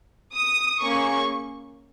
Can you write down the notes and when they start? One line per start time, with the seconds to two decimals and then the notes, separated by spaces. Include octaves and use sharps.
0.34 D#6
0.81 A#3 C#4 G#4 C#6